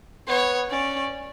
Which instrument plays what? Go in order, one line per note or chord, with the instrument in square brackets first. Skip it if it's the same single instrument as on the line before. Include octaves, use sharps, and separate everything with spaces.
[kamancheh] B3 [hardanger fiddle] C#5
[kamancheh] C#4 [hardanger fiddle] D5